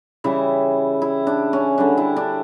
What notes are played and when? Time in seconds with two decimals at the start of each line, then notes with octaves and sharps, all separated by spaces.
0.24 C#3 E3 G3 E4
1.02 E4
1.27 D4
1.53 C#4
1.78 D3 G3 D4
1.97 E4
2.17 D4